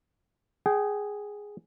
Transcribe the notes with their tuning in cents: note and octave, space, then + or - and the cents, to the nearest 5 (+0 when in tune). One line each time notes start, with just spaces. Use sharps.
G#4 +0 G5 -30